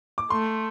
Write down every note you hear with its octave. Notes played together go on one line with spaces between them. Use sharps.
D6
A3 C6